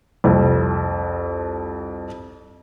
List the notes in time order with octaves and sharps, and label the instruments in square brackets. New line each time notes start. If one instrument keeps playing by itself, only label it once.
[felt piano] C2 F2